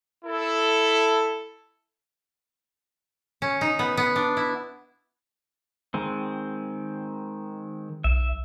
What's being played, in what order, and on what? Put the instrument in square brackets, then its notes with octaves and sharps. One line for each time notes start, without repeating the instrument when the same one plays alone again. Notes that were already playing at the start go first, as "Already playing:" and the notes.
[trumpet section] E4 A4
[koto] C#4
D#4
B3
B3
D4
E4
[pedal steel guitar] D#3 G#3 C4
[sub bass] B1 [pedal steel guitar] E5